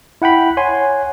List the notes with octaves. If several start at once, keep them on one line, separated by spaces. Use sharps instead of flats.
E4 F#5 G5 B5
C#5 F#5 G#5 C6